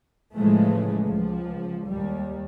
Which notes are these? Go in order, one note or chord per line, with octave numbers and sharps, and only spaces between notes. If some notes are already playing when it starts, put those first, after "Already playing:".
A2 C#3 E3 F3 G#3 A3
C#2 F3
D#2 G3